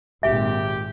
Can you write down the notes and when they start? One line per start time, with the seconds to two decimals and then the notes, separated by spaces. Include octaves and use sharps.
0.23 G#1 A#2 G4 E5